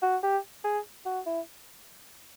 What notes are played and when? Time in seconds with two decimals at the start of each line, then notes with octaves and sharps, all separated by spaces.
0.03 F#4
0.23 G4
0.65 G#4
1.06 F#4
1.26 E4